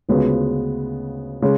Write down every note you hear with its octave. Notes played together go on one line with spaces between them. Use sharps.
D2 C#3 G#3 B3 F4
C#3 G#3